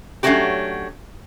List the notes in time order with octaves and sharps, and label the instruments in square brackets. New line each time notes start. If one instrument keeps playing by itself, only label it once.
[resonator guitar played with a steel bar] F#3 A3 C#4 D4 F#4 G4